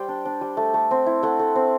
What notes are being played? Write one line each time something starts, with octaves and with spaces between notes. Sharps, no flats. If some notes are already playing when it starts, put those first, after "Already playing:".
Already playing: G3 C5 G5
D4
D4
G3
A3
A3
C4
E4
A3 F#5
A3
C4